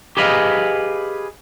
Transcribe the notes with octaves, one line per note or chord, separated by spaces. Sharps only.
G4 G#4 B4 D#5 F5